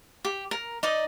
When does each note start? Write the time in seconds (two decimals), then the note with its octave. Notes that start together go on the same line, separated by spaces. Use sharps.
0.25 G4
0.51 A#4
0.83 D#4 D5 D#5